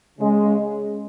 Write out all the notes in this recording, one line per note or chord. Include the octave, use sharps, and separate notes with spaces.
C#3 G#3